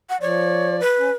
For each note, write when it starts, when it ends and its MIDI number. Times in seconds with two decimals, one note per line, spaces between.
0.09 0.17 78
0.21 0.80 53
0.21 0.79 73
0.21 0.80 74
0.80 1.13 71
0.99 1.10 61